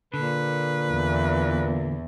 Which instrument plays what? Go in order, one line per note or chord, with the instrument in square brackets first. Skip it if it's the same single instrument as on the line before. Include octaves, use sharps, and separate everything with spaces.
[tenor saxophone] A#2 [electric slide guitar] D3 [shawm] B4
[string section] E2